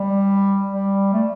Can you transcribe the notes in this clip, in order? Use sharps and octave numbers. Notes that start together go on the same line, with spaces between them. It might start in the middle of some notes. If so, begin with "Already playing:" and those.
Already playing: G3
G3
A3